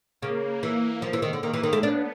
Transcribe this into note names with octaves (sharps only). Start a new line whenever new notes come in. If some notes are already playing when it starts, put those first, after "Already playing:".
C#3 A#3
E3
F3
E3
D#3
D3
D#3 A#3
E3
D#3
A3
B3 D4